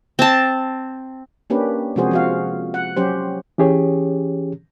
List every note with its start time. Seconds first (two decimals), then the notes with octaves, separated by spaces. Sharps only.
0.19 C4 A5
1.50 A#3 C#4 D4 G4 B4
1.96 C3 F3 G#3 F#4 G#4 C5
2.11 F3 F#4 F5
2.74 F#5
2.97 F#3 C#4 G4 C5
3.58 E3 C#4 G4 G#4 C#5